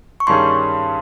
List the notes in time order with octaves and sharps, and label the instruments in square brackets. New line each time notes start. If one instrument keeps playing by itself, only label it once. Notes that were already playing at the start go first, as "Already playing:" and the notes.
[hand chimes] C#6
[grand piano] G2 D#3 G3 C#4 G#4 [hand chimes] C6